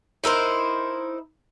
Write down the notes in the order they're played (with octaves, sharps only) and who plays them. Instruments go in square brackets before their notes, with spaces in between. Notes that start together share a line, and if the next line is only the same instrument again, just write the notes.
[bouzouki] D#4 E4 A#4 C5